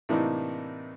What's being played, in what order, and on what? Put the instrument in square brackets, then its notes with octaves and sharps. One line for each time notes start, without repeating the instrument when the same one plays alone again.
[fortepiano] A2 C3 E3 A#3 D4 D#4